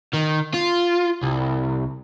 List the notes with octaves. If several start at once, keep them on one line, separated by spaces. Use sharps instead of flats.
D#3
F4
C2